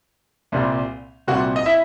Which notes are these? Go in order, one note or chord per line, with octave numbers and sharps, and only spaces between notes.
C2 A#2 G3 C4
C2 A#2 G3 C4 F#4 F#5
D#5
E4 E5